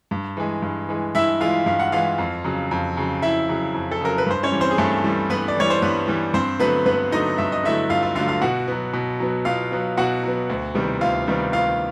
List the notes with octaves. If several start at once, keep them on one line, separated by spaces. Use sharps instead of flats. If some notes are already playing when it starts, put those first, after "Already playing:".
G2
E3 G#3
G2
E3 G#3
G2 E4 E5
E3 G#3 F4 F5
G2 F5
F#5
E3 G#3 F4 F5
F2
C#3 F#3
F2
C#3 F#3
F2 E4 E5
C#3 F#3
F2
A4
C#3 F#3 A#4
B4
G2 C5
C#4 C#5
E3 G3
C4 C5
G#4
G2 A3 A4
E3 G3
G2 B3 B4
D5
E3 G3 C#5
C5
G2 B3 B4
E3 G3
G2 C4 C5
D3 F#3 A3 B3 B4
G2 B3 B4
D3 F#3 A3 D#4 D#5
G2 E5
D#5
D3 F#3 A3 E4 E5
G2 F4 F5
F4 F5
D3 F#3 A3 F4 F5
F4 F5
B2 F#4 F#5
F#3 B3
B2
F#3 B3
B2 F4 F5
F#3 B3
B2 F#4 F#5
F#3 B3
D2
C3 D#3 G3 B3
D2 F4 F5
C3 D#3 G3 B3
D2 F4 F5